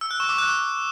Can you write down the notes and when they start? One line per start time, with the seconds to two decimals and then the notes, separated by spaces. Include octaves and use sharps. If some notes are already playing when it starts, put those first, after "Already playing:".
0.01 E6
0.11 F#6
0.20 C#6
0.29 D6
0.38 F#6